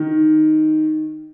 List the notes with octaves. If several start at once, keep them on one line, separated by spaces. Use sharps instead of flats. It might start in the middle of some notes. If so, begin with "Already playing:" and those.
Already playing: D#3